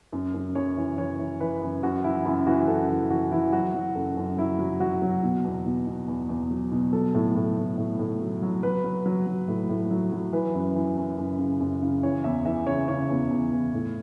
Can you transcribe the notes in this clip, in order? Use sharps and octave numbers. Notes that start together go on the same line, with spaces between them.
F#2
F#2
F#2 C#5
E3
E3 C#5
E3
E3 B4
F#2
F#2 F#4
E3 E4
F#2 E4
E3 F#4
F#2 A4
E3
E3 F#4
E3 E4
F#3 F#4
F#3
F#2 A4
F#2
F#3 E4
F#3
F#3 F#4
F#3
B2
E2
B2
B2
E2
E2
F#3
B2
F#3 A4
A2
A2
A2
A2
A2
F#3
F#3
F#3 B4
F#3
F#3
F#3
A2
A2
F#3
F#3
E3 B4
F#2
E3
F#2
F#2
C#3
F#2
C#3
E3 C#5
E2 E5
E3 E5
C#3 C#5
C#3 C#5
E2
E2
E2
A2